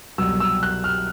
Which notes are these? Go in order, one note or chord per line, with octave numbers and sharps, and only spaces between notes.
C2 B2 F#3 E6
E6
F#6
F6